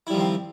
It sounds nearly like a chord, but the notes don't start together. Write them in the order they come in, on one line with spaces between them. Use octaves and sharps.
E4 G3 F3 D#3 C4